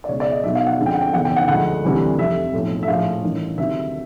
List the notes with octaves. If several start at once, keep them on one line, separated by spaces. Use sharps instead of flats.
D5
C#2 B2 G#3 C#5
D5
D#5
B1 B2 F#3 E5
F5
F#5
F2 D3 F3 G#3
G5
F#5
G5
F#1 E2 B2 F#5
G5
F#5
D2 D3 F3 G#3 F#5
D2 C3 E3 G3
F1 F2 C3 E5
B1 A2 F3
E5
A#1 A2 F3 F5
A1 G2 D#3
D2 C3 D#3 F#3 E5